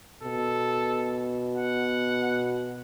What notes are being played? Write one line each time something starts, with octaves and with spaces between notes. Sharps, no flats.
B2 A4
F#5